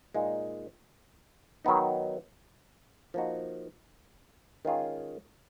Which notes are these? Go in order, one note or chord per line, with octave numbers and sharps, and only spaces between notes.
A#2 G#3 D#4
D#3 F#3 B3 D#4
F3 A#3 D#4 F#4
D#3 G#3 C#4 F4 G#4